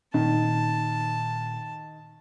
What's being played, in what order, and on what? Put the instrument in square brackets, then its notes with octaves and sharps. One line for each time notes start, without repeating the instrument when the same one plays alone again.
[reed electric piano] A#2 [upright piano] D#3 [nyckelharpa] A5